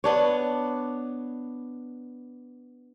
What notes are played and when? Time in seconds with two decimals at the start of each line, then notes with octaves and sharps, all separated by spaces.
0.04 B3 D4 C#5